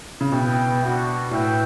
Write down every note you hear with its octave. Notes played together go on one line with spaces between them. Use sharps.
C#3
B2 E4 B4 E5 G5
B3 D4 F#4
A2 F#4 B4 E5 G5